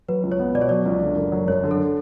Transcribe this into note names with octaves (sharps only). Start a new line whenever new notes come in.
F#3 B4
C#2
C#5
B3
B2 D5
C#5
F#3 D5
C#2
D3
F#1
F#3
F#2 C#5
D3
A4